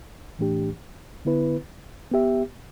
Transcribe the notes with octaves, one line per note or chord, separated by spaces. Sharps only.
A2 E3 A3 D4 G4
D3 B3 E4 B4
B3 G4 E5